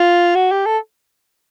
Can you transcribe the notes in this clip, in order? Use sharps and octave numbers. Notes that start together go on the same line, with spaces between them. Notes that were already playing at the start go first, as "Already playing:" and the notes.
Already playing: F4
F#4
G4
A4